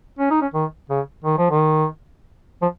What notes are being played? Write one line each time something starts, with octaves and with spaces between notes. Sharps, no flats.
C#4
D#4
C#4
D#3
C#3
D#3
F3
D#3
F3